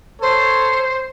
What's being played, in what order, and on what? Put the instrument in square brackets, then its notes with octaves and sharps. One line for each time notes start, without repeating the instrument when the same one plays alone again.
[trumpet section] A4 C#5 [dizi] C5